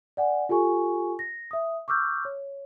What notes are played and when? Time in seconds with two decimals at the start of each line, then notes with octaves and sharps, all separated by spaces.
0.17 D5 F#5 G#5
0.49 F4 G4 A4 G#5 C#6
1.19 A#6
1.51 E5 D#6
1.88 C#6 D6 E6 F6 G6
2.25 C#5